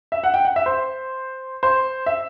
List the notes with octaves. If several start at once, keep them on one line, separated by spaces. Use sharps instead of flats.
E5
F#5
G5
F#5
E5
C5
C5
E5